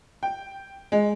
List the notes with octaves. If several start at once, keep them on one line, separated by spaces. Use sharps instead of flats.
G5
G#3